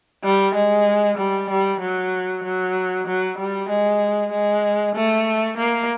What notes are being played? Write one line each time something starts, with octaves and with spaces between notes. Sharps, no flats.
G3
G#3
G3
G3
F#3
F#3
F#3
G3
G#3
G#3
A3
A#3